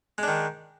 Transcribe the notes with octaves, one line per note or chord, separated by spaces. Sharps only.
D#3 G#3 D4